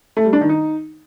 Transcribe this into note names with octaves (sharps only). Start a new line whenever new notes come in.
A3
G3
D4
D#3
D#4